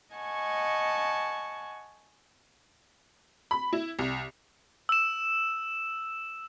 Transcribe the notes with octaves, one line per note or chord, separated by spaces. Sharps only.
D#5 F#5 G#5 A5 C#6
B5
E4
C2
E6 E7